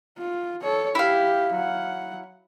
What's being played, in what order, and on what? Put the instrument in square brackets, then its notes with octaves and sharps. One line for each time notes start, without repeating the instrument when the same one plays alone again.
[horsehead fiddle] F4
A4 C#5
[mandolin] E4 F5 [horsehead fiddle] G4
[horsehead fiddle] F#3 F#5